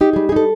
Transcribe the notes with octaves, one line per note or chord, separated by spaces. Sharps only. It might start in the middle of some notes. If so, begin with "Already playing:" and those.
D#4 G4
G3 G#4
G#4
D#4 A4